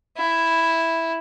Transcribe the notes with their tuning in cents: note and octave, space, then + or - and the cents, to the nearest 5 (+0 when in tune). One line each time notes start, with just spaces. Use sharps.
E4 +0